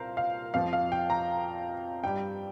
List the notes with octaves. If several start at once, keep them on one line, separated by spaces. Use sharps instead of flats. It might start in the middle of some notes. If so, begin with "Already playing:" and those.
Already playing: C2 A#2 A#4 C5 F5
F5
F2 F3 F5
F5
G5
A#5
G2 G3 G5